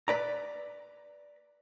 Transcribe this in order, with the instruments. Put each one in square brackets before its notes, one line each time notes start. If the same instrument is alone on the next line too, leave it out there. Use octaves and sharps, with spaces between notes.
[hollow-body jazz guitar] B4 D5 A#5